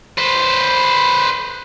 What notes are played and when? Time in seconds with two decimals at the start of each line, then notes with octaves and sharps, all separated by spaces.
0.18 B4 C5